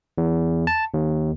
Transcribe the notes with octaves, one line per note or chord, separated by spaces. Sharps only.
E2
A5
D#2